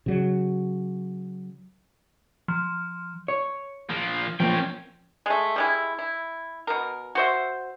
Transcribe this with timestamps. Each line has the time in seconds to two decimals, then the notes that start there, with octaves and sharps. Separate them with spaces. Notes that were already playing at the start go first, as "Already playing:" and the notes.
0.06 C#3 F#3
2.48 F3
3.28 C#5
3.90 F3 A#3
4.40 F3 A#3 C#4 G5
5.26 G#3 A3
5.56 G3 G#3 E4
5.99 E4
6.67 B2 A#4
7.15 F#4 C5 E5